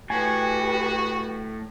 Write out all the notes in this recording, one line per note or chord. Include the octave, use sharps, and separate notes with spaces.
A2 F#4 G4 B4 G#5